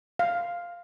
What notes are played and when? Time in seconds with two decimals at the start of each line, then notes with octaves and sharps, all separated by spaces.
0.19 F5